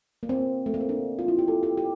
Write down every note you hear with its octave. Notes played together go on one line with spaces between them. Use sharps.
A#3
C4
A3
A#3
C4
D4
F4
E4
G4
A4
G4
G4